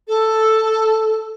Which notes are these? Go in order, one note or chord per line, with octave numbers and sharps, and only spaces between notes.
A4